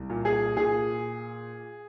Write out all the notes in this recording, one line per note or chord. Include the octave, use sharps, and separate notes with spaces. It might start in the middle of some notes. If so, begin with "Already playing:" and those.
Already playing: C2
A#2
G#4
A#2 G#4